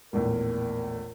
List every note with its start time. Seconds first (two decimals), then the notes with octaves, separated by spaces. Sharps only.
0.13 A#1 E2 A2 A#4